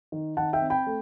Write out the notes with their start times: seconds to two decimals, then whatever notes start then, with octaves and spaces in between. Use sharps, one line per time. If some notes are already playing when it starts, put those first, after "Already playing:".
0.12 D#3
0.37 D#3 F#5 A5
0.53 E5 G5
0.62 C4
0.70 G5 B5
0.87 A3